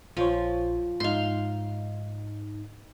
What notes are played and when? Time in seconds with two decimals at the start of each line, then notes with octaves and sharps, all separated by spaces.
0.17 A#1 F3 C5 C#5
1.00 G#2 D#4 F5 C6